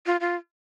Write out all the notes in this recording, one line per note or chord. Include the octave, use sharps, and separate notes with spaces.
F4
F4